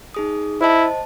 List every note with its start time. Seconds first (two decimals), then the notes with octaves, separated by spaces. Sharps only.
0.14 D#4 G#4 D#6
0.61 E4 C5 D#5 A5